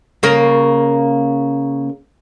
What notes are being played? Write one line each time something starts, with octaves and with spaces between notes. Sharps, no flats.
C#3 A#3 A#4